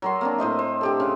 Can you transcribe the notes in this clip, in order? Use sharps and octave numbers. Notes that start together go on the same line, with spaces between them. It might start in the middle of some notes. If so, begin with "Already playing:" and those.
F#3 A#4 C6
A#3 C4 D4
A2 C5 D#5 E5
C5
D3 G4 A4
C#3